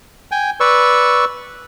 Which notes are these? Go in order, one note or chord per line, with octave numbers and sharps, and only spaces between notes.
G5 G#5
B4 D5 C#6 E6